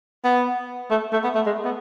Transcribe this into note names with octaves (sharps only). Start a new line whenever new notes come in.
B3
A3
A3
B3
A3
G#3
B3